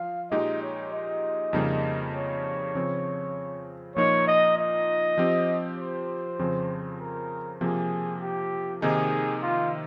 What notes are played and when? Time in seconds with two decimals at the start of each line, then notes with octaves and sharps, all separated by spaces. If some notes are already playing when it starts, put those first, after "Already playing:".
Already playing: F3 F4 F5
0.31 A#2 G#3 D#4 G4 D#5
0.62 C#5
0.93 D#5
1.53 F2 C#3 G3 A#3 D#4
2.14 C#5
2.75 C#3 F3 C4
3.96 A#2 F3 A#3 D#4 C#5
4.27 D#5
4.57 D#5
5.18 F3 C4 G4
5.78 C5
6.39 F2 C#3 F3 C4
7.00 A#4
7.61 C3 F3 A#3 G#4
8.22 G4
8.82 C3 D#3 A#3 D#4 G#4
9.43 F4